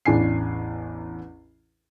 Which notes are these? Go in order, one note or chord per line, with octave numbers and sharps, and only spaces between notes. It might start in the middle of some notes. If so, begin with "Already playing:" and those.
A1 E2 D4 G#5 C7